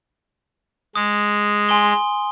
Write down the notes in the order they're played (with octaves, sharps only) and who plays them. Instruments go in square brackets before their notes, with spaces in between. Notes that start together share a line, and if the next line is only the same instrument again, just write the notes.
[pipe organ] G#3 [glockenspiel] D#6
[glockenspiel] G#5 C6 G7